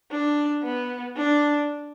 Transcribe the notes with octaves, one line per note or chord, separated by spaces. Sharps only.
D4
B3
D4